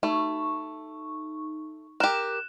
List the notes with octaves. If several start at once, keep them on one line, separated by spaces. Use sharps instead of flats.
A3 D#4 C#6
G4 A#4 F#6 E7